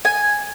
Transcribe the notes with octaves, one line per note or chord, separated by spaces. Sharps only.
G#5